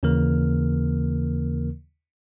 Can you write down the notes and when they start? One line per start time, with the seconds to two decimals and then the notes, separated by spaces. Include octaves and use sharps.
0.03 D#2 C#3 E3 A#3 A#4 F6